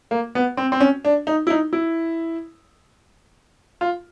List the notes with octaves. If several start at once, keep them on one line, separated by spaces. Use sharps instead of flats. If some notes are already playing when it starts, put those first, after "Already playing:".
A#3
B3
C4
C4
C#4
D4
D#4
E4
D#4
E4
F4